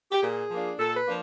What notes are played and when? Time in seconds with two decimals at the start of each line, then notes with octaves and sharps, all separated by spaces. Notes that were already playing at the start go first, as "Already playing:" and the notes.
0.11 G4
0.23 A#2 G#4
0.51 F3 A#3 D4 F4
0.78 A#2 A4
0.96 B4
1.05 F3 A#3 D4 F4